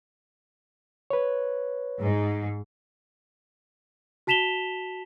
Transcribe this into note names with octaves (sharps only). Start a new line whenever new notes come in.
B4 C#5
G#2
F#4 A5 B6 E7 F7 G7